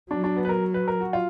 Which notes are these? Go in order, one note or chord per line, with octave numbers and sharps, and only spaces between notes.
F#3 D4
D4
B3
B4
A#4
B4
A#4
F#4
F4